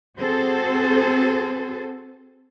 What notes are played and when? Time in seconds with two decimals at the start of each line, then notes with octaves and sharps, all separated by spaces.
0.17 C4 F#4 G#4 A4 C5